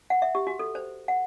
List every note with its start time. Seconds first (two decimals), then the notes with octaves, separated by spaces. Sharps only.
0.10 F#5
0.22 E5
0.35 G4
0.47 F#4
0.59 A4
0.75 C5
1.08 F#5